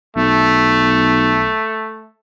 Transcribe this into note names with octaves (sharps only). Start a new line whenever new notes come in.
B1 A3